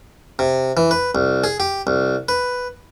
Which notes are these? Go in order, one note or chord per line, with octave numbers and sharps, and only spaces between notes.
C3
E3
B4
C2
G#4
G4
C2
B4